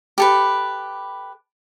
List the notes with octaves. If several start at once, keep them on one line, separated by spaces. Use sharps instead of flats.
G4 A4 B4